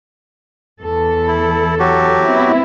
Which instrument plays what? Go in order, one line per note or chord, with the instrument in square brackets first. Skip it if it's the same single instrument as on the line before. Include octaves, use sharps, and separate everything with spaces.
[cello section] E2 A4
[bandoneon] E4
F#3 F#4 G4
[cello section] B3 C4 E4